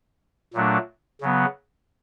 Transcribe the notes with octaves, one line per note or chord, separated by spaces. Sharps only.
A#2 F#3 A3 D4
C#3 F#3 B3